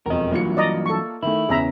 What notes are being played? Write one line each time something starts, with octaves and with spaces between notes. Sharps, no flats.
E1 F2 A#4 D#5
G2 E3 F#3 A#3 F4 C#7
D5 D#5 A#5
A4 C#6
D#3 A3 E4
E2 C#3 E3 G#4 E5 A#5